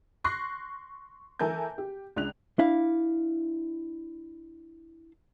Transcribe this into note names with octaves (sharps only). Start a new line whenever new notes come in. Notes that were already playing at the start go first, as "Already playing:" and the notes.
C6 C#6 F#6 A#6 C7
E3 A4 A#4 G#5 A5 G6
G4
C#2 D4 F#6 F7
D4 E4 F5